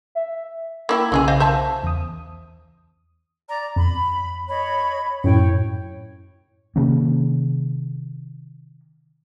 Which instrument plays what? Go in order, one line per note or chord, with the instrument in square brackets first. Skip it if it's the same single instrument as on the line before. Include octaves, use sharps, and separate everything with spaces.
[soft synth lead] E5
[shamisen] A#3 E4 G5 [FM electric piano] B5 E6 G#6
[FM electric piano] B1 C#3 [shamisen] E3 G#3 G#4
[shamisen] C5 D#5 F5
C5 E5 A5
[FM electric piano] E2 D#6
[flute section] D5 A#5
[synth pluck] F2 [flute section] B5
[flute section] C#5 D#5 B5
[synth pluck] F#2 A2 [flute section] C#5 G5
[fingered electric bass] C3 D#3 A#3 C#4